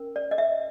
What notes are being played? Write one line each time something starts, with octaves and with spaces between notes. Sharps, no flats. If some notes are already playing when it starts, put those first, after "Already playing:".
Already playing: C#4 A#4
D5
D#5
E5